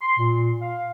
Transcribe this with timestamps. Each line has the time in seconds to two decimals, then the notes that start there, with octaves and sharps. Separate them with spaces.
0.01 C6
0.18 A#2
0.60 F5